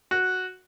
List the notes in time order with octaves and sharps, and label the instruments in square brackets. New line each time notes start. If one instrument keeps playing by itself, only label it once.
[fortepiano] F#4